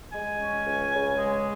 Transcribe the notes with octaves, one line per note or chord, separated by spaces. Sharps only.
G#3 G#5
C#4
C#2
C#3
G#3